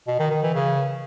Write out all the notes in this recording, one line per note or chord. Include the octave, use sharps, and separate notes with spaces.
B2
D#3
D#3
E3
C#3